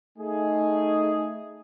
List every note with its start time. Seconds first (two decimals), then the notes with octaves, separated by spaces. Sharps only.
0.18 A3 D#4 G#4